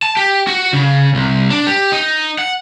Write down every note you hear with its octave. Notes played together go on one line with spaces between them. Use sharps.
A5
G4
F#4
C#3
C2
D4
G4
D#4
F#5